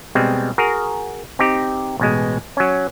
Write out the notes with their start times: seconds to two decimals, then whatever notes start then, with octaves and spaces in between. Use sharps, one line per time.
0.15 B2 G3 G#3 C4
0.58 F#4 G#4 A#4
1.39 C4 D#4 G4
1.99 A1 B2 G#3
2.57 F#3 C#4